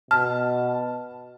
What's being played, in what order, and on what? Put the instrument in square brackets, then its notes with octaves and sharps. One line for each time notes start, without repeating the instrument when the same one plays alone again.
[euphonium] B2 [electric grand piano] A5 [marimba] F6